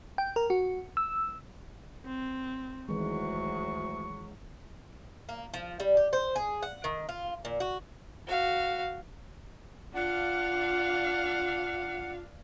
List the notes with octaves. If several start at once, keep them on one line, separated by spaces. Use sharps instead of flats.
G5
A#4
F#4
E6
C4
D2 D#3 E3 F#3 G#3 C#6
A#3
F3
G3
G4
C5
G#4
F#5
D#3
F4
A#2
F#4
F#4 F5
D4 F4 F5 F#5